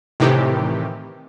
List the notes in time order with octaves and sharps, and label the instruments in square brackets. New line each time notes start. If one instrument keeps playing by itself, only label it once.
[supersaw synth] A2 C3 D#3 E3 G4